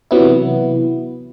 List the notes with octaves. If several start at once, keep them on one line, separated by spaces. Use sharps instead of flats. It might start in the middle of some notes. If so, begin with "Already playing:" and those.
C3 E3 F#3 B3 E4